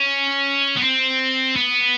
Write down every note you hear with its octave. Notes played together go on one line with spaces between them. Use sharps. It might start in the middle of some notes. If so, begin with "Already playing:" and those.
Already playing: C#4
B3
C4
B3